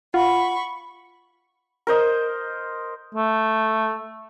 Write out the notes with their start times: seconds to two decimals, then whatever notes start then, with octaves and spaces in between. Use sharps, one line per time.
0.14 F4 F#5 B5 C#6
1.87 A#4 C5 D#5
3.15 A3